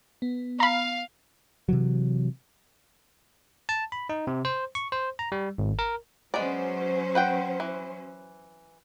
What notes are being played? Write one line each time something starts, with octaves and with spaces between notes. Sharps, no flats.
B3
F5 A#5 B5
C3 E3 F#3
A5
B5
D#4
C3
C5
C#6
C5
A#5
G3
G#1
A#4
F#3 G#3 B3 C#4 C5 D5
B4 F#5 G5
E3